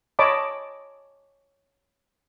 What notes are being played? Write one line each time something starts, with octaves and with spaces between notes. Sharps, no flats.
C#5 D#5 A5 B5 D6